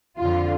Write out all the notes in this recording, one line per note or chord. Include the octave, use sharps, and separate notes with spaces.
F2 D3 F4